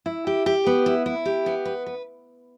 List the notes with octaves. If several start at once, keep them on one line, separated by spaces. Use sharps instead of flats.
E4
G4
G4
B3
E4
E4
G4
B3
B4
B4